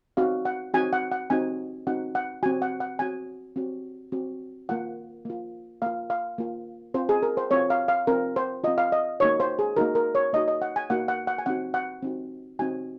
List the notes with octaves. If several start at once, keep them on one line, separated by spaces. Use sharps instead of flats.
C4 D#4 F#4 F5
F#5
C4 D#4 F#4 G#5
F#5
F#5
C4 D#4 F#4 G#5
C4 D#4 F#4 F#5
F#5
C4 F#4 G#5
F#5
F#5
C4 F#4 G#5
C4 F#4
C4 F#4
A#3 F4 F#5
A#3 F4
A#3 F4 F5
F5
A#3 F4
C4 F4 C5
G#4
A#4
C5
C4 F4 C#5
F5
F5
C4 F4 A#4
C5
C4 F4 D#5
F5
D#5
A#3 D#4 F#4 C#5
C5
G#4
A#3 D#4 F#4 A#4
A#4
C#5
A#3 D#4 F#4 D#5
D#5
F#5
G#5
A#3 D#4 F#4 F#5
F#5
F#5
G#5
C4 D#4 F#4 F#5
F#5
C4 D#4 F#4
C4 D#4 F#4 G#5